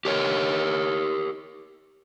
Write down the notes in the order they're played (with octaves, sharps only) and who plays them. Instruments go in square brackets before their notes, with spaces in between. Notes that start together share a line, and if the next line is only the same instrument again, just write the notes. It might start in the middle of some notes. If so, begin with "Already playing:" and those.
[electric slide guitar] G4 A#4 C#5